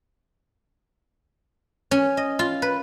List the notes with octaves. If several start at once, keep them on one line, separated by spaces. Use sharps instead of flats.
C#4
D#5
F4
B4